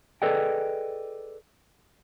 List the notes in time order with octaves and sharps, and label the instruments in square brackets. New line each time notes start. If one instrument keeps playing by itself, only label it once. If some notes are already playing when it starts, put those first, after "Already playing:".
[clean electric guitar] G#4 A4 B4 D5 D#5 G5